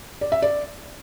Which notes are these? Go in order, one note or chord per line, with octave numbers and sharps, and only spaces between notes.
D5
E5
D5